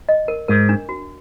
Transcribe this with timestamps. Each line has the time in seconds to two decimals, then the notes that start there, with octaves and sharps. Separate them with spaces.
0.09 D#5
0.28 A#4
0.48 G#2 A#4
0.69 D4
0.89 F#4